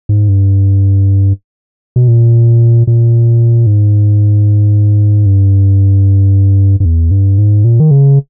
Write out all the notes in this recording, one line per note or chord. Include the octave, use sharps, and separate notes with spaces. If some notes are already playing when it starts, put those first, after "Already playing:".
G#2
G2
B2
A#2
A#2
G#2
G2
G2
E2
G2
G#2
A#2
D#3
C#3